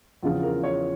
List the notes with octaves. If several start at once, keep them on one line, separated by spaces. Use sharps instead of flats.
E2 C#3 F3 F4
A#4
C#5